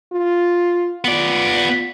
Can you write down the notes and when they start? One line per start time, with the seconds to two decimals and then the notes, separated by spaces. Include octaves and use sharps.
0.12 F4
1.05 B3 F4 D5